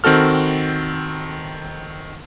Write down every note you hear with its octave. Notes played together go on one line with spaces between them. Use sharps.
D#3 C4 F#4 A4 F6